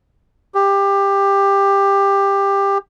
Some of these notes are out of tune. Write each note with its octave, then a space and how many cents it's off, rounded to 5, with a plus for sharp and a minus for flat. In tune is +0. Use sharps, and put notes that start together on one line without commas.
G4 +15